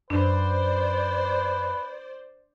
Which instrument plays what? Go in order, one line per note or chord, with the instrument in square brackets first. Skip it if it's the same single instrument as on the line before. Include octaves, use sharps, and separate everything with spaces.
[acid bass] F#2 [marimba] D4 [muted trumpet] B4 [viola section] C5 D5